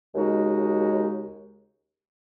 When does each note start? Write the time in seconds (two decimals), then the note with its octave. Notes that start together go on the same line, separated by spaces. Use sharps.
0.15 D#2 C#3 G#3 D#4 F#4